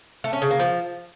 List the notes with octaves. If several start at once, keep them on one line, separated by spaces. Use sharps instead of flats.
A3
C#4
C#3
A#3
F3